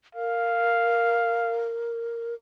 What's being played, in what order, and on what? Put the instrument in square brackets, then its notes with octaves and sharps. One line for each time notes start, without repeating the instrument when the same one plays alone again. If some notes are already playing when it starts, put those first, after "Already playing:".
[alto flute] A#4 [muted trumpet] F5